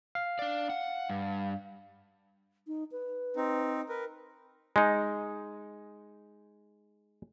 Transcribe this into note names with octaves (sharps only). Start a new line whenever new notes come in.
F5
D4 D5
F#5
G2
D#4
B4
C4 D#4
A#4 B4
G#3 D#4